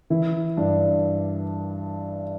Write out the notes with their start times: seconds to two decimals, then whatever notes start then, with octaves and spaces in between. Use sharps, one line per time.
0.10 E3 E4
0.57 G2 D4